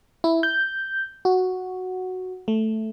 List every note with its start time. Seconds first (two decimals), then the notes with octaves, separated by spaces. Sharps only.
0.24 E4
0.43 G6
1.25 F#4
2.48 A3